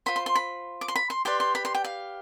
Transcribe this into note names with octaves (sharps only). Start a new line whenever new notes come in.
F4 C5 B5
C6
C6
B5
D6
C6
B5
C6
G4 B4 D5 C6
C6
B5
C6
G5
F5